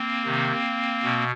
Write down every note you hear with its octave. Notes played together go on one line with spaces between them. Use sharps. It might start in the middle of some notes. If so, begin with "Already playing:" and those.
Already playing: A#3 C4
C3 D#3
B2